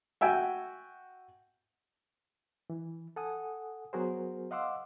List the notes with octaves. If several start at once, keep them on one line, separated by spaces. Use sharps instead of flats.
F#4 E5 G5 G#5
E3
A4 F#5 G#5 D#6
F#3 B3 F#4 G#4 A#4 C5
D#5 F5 F#5 C6 D6 E6